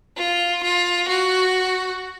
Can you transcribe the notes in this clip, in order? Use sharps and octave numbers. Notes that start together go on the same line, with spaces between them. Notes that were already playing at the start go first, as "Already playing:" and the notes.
F4
F4
F#4